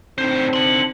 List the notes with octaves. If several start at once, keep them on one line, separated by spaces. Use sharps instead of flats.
A2 D3 C4 D#4 C5
D4 C6 F#7